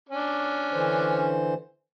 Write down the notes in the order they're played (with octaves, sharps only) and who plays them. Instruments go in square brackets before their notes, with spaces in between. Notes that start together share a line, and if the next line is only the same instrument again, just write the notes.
[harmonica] C#4 D4
[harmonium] D3 E3 C5